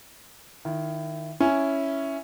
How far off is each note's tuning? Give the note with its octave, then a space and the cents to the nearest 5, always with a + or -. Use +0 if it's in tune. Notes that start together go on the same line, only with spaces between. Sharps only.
D#3 -5 E4 +20
C#4 +0 E4 +0